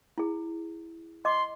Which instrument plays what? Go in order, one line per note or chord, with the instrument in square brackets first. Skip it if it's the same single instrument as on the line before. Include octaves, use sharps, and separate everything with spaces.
[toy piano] E4 G#4
[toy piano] D#5 D6 [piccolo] C6